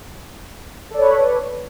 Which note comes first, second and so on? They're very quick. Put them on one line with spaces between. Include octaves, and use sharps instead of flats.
A4 D5 C#5 B4